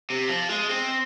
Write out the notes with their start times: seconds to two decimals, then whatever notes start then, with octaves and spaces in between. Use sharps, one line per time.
0.10 C3
0.29 F3
0.49 G#3
0.69 C4